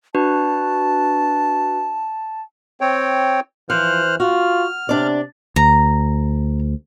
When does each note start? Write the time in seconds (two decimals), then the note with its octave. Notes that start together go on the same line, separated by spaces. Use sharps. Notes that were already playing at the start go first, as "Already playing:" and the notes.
0.15 D4 F#4 B4 A5
2.81 C4 C#5 G5
3.70 E3 F3 C5 F6 F#6
4.20 F4 F#4 F6
4.89 C3 D4 D5
5.56 D2 A#5